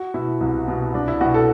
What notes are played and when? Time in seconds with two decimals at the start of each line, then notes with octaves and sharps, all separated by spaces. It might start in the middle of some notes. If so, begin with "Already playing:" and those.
Already playing: F#4
0.14 B2 E4
0.41 C2
0.68 B2
0.94 C2 D4
1.08 E4
1.21 B2 F#4
1.34 A4